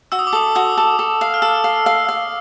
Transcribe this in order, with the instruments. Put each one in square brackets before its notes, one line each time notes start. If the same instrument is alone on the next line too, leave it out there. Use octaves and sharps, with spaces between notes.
[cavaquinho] F#4 [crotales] E6
[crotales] D#6
D6
[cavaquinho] A4 [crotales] D#6
[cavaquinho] F#4 [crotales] D#6
[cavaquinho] A4
A4
F5
[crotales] F6
[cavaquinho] A4 [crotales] E6
[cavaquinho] F5
F5
F5